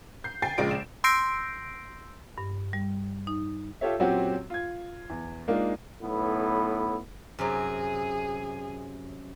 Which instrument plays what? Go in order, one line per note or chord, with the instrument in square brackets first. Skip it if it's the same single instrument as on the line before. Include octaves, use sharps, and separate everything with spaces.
[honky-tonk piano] G6 C7
G5 G#5 A6 C7
A#1 C#3 G#3 F4 D5 D7
E7
[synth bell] C6 E6 G6 A#6 C7 D7
[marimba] G2
G3
D#4
[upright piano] F4 G4 A4 C#5 E5
A#2 F#3 C4 C#4 F#4 G4
F4 G#6
E2
G#3 A#3 D4 D#4 F4
[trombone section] B1 A2 B3 E4
[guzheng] F#2 C3 F#3 [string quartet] G#4